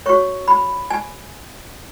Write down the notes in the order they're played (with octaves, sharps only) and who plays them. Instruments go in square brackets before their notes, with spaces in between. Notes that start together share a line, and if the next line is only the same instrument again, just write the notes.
[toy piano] F#4 C#5 C#6
B5
G#5